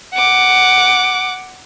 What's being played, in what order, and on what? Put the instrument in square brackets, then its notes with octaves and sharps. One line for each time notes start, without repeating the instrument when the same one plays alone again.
[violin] F#5 D6